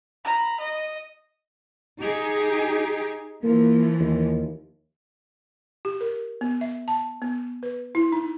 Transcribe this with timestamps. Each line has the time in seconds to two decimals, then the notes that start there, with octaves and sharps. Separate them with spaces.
0.25 A#5 B5
0.60 D#5
2.00 D#4 G4 G#4
3.43 E3 F3 A#3
3.99 D#2
5.85 G4
6.01 A#4
6.41 B3
6.61 E5
6.88 A5
7.22 B3
7.63 B4
7.95 E4
8.12 D#4